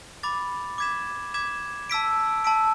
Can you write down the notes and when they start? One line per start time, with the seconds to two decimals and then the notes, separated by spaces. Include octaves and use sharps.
0.23 B5 D6 A6
0.78 D6 G#6 B6 E7
1.34 D6 G#6 B6 E7
1.90 A5 E6 B6 D7
2.44 A5 E6 B6 D7